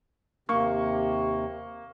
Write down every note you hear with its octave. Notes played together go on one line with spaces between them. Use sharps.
D#2 C3 A#3 C#6